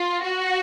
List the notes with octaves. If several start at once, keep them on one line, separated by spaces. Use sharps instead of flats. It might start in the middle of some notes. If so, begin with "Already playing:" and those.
Already playing: F4
F#4